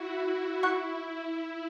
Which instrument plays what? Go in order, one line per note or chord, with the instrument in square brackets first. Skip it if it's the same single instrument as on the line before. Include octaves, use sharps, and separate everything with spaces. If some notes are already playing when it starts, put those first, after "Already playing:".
Already playing: [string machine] E4 F#4
[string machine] E4 [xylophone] F#5 C#6 F#6